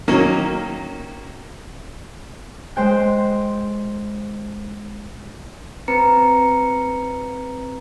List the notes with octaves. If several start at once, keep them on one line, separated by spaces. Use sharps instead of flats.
D#3 F#3 A#3 C#4
G#3 C5 G5 F#6
C4 B4 A#5 C#7